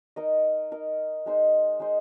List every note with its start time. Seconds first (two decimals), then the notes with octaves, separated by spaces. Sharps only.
0.16 D#4 A#4 D#5
0.71 D#4 A#4 D#5
1.26 G#3 D#4 C5 D#5
1.80 G#3 D#4 C5 D#5